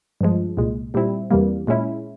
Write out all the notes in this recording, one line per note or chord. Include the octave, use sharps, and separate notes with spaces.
G2 F3 G#3
C2 A#2 G#3
A#2 G3 C4 E4
E2 C3 E3 G3 A#3
A#2 G#3 C#4 E4